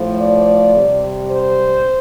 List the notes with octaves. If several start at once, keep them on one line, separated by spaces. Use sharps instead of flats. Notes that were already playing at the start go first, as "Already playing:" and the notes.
Already playing: A2 F3
D5
C3 G3
C5